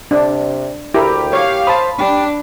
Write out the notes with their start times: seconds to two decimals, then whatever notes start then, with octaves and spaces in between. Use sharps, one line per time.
0.11 C3 D4
0.94 D2 E4 G4 A#4
1.33 C#5 F5
1.67 C5 A5 B5 D#6
2.00 D4 G4